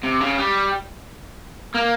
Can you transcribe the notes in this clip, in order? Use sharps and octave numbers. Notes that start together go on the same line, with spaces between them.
C3
C#3
G3
A#3